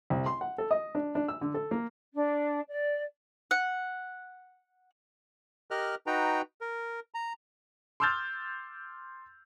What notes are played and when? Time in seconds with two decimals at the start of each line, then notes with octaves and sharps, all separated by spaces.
0.10 C2
0.26 C6
0.41 F#5
0.58 A4
0.71 D#5
0.95 D4
1.15 D4
1.28 E6
1.41 D3
1.54 A4
1.71 A#3
2.14 D4
2.69 D5
3.51 F#5
5.71 G4 A#4 D#5 F6 F#6
6.07 D#4 F#4 B4 G5 A#5
6.61 A#4
7.14 A#5
8.00 C6 D6 E6 F6 G6 A6